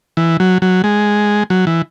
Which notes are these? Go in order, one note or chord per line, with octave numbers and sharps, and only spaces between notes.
E3
F#3
F#3
G#3
F#3
E3